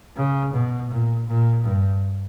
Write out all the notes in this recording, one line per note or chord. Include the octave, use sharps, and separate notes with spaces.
C#3
B2
A#2
A#2
G2